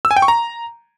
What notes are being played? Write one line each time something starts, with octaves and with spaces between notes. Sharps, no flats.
E6
G#5
G5
C#6
A#5